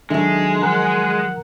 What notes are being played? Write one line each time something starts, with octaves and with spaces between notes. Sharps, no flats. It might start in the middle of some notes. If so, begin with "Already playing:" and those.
D#3 F#3 G#3 D4 A4 E5
F3 A#4 F#5 A#5